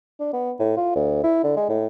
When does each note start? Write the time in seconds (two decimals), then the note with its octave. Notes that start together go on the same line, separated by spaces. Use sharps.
0.20 D4
0.33 B3
0.60 A2
0.77 F4
0.96 D2
1.24 E4
1.44 D3
1.57 G#3
1.69 A2